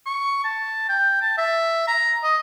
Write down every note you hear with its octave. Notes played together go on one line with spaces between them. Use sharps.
C#6
A5
G5
A5
E5
A#5
D#5